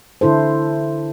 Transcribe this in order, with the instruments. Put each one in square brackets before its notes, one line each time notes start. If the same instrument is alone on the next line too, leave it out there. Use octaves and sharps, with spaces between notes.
[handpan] D3 E4 A4 C5